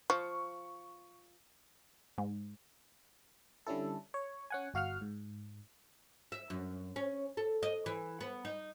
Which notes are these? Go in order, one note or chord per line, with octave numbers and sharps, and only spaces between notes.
F3 C#6
G#2
D3 G3 C#4 E4 A4
C#5
C#4 F#5 G#5
G1 F#4 F5 F#5 F6
G#2
E5
F#2
C#4
A4
D#5
E3
B3
D#4